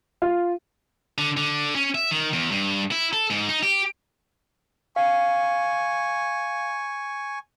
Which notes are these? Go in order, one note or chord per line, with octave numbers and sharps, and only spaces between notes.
F4
D3
D3
C#4
E5
D#3
E2
G2
E4
A4
G#2
D#4
G4
F5 G#5 C#6